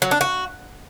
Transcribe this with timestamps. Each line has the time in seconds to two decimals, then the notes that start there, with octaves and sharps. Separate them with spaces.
0.02 F#3
0.11 D4
0.21 F#4